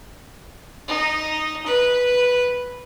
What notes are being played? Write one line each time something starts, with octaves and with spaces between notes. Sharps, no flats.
D#4
B4